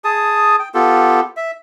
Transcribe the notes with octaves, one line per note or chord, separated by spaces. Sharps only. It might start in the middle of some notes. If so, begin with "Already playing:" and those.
G#4 A5 D#6
G5
B3 F4 G4 A4
E5